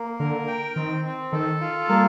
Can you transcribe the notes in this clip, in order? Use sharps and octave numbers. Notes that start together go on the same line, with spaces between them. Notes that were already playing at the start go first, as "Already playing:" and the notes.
Already playing: A#3
D3 A#4
G5
D#3 C4
C4
D#3 A4
F4
G3 A#3